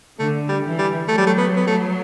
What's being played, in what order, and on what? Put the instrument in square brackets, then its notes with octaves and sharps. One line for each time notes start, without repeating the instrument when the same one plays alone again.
[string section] D3 [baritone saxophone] A3
[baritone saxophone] G3
[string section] E3
[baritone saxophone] G3
[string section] F#3 [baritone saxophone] A3
[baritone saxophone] G3
A3
B3
B3
A3